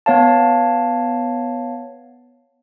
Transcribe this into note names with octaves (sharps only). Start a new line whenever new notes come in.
B3 C#5 F5 A5